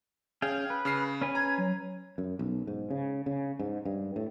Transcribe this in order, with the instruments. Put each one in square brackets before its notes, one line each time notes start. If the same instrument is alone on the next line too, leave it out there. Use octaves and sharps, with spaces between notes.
[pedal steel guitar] C#4 F5 G5 [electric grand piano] G#4
[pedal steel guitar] B4
[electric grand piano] C#3 F6 C7
[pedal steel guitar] C#4 B4 G#5
[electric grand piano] A#5 [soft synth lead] G#6
[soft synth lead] F#3
[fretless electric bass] F#2
B1
G#2
C#3
C#3
G#2
G2
A2